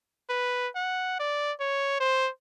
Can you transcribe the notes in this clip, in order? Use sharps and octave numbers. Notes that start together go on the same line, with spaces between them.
B4
F#5
D5
C#5
C5